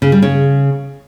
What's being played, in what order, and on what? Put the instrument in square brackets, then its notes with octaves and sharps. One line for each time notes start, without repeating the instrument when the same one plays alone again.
[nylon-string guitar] C#3
G3
C#3